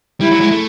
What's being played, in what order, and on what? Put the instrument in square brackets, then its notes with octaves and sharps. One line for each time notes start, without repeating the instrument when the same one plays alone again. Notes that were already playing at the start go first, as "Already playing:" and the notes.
[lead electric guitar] G3 [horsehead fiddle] E4
[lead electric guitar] F#3
G#3
A3